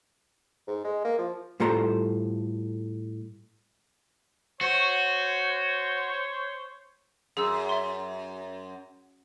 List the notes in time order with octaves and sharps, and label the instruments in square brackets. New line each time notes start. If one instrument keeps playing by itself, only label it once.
[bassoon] G#2
G#3
A#3
F3
[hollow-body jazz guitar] A2 G3 F4 A4 C5 A#5
[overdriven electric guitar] F#4 [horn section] C5 C#5
[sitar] F#2 [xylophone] G#4 E6
[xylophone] E5 C6